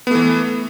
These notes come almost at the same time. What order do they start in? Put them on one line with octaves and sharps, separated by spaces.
B3 A3 E3